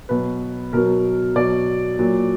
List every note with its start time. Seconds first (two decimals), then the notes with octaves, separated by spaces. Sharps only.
0.09 B2 F#3 B4
0.73 B2 F#3 A#4
1.36 B2 F#3 D5
1.99 A#2 F#3